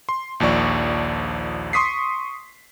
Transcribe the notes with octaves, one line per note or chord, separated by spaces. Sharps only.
C6
A#1 D#2 F3 D5 C#6
C6 C#6 D#6 B6 C7